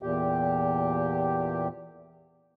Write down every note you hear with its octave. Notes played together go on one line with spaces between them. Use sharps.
E2 A#2 G4